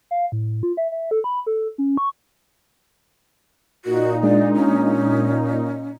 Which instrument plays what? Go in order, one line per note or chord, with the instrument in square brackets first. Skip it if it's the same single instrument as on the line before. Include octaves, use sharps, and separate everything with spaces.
[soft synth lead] F5
A2
F4
E5
E5
A4
B5
A4
C#4
C#6
[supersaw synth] A#2 D#4 [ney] F#4
[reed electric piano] G#3 D4 [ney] D5
[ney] C#4